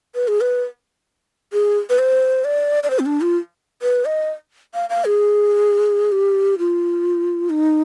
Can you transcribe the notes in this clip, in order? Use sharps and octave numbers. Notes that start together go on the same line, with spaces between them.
B4
G#4
B4
G#4
B4
C5
D5
D5
C5
C4
D4
F4
B4
D#5
F5
F5
G#4
G4
F4
D#4